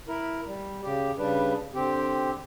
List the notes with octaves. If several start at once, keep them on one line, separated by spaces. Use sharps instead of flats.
E4 A#4
G3
C#3 G4
C#3 G3 D4 B4
D3 C4 G4